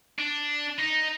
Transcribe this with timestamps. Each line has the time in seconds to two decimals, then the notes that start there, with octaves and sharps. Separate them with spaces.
0.19 D4
0.79 D#4